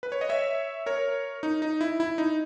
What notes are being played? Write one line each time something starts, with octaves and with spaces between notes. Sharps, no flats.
B4
C#5
D#5
C#5 E5
A#4 C#5
D#4
D#4
E4
E4
D#4